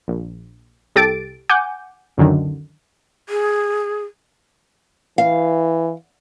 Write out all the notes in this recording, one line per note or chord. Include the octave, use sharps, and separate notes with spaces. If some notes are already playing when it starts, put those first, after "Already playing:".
A#1
C2 G4 A4 A6 D7
F#5 G#5 D6 G6
C#2 F#2 D3 D#3
G#4
E3 F5